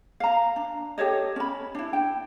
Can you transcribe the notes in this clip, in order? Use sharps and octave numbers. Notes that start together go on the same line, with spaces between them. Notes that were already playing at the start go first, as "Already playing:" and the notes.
F5 A#5
D4
G4 A4 C#5 D#5
C#4 B5
D4 E4
G5